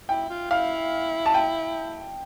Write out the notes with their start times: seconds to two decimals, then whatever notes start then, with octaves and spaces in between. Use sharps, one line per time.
0.09 E4 G5
0.29 F4
0.51 E4 F5
1.26 A5
1.34 G5